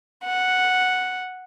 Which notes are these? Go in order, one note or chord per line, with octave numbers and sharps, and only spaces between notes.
F#5